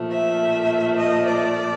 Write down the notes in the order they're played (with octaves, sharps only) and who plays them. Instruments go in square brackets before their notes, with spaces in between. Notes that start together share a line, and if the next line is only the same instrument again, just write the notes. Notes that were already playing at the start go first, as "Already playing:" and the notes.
Already playing: [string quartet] A#2 F3 A3
E5
D#5
D5